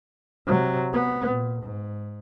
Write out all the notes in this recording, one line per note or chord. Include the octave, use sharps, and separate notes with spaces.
C3 F#3
B3
A#2
G#2